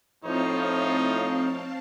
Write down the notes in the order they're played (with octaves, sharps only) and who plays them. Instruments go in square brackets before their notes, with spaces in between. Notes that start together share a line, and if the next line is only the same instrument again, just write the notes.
[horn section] A2 F3 [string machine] C4 F5 A5 [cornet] D#4 [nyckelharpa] C#5